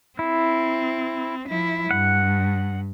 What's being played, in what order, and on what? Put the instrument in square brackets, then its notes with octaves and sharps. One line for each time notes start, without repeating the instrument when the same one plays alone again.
[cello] C4 [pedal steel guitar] E4
[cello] F3 E4
[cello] G2 [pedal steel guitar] F#5